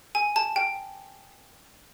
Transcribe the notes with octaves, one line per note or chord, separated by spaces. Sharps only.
G#5
A5
G5